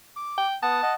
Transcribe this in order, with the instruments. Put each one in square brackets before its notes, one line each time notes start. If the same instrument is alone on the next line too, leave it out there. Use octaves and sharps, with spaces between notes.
[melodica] D6
[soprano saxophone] G5
[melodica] B3 F#5 D#6 [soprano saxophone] A5
[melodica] D#5 F#5